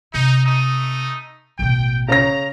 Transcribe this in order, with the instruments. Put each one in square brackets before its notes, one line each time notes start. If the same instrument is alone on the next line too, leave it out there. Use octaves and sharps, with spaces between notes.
[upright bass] C3 [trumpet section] D#4
[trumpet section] A3 D#4 D#6
[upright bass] A1 B2 [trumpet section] G5
[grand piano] C#3 C#4 A#6 [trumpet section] A#5